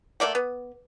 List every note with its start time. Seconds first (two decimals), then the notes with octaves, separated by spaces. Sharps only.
0.20 A3 A#3 D5 F#5
0.35 B3